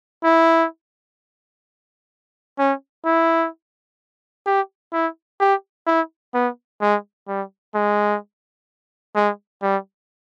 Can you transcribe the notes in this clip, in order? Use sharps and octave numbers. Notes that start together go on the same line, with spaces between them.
E4
C#4
E4
G4
E4
G4
E4
B3
G#3
G3
G#3
G#3
G3